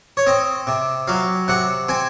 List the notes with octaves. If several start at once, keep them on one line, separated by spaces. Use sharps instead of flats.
C#5
C4 D#5
C3
F#3 F5
C3 F#5
C4 G#5